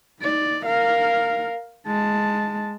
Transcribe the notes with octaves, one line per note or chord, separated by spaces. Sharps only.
D#4 D5
A#4 F5
G#3 A5